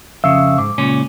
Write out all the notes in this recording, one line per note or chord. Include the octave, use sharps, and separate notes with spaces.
F2 C#3 E5 F5 E6
G#2 D6
C#2 A#2 C#4